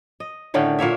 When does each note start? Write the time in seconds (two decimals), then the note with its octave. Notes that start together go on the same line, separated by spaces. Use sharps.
0.20 D#5
0.54 A2 D3 D#3 C#4
0.79 A#2 A#3 C#5 E5